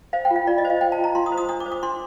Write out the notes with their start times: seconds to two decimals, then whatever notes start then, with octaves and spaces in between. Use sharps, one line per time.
0.13 C5 F5
0.25 G5
0.30 F4
0.36 F5
0.47 F4 D5
0.58 D#5
0.65 C5
0.70 F5
0.81 C5 G5
0.92 A5
0.98 F4
1.04 A#5
1.15 F4 C6
1.26 D#6
1.32 C5
1.37 D#6
1.49 D4 D#6
1.60 D6
1.66 C5
1.72 D6
1.83 D4 C6